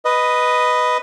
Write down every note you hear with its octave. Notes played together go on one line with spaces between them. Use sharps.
B4 D#5